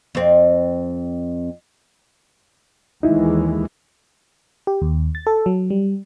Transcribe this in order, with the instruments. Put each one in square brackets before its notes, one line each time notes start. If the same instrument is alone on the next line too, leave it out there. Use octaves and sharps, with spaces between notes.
[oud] F2 C4
[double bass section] D#2 E3 G#3 [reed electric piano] D#4 E4
[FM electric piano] G4
D#2
A6
A4
F#3
G3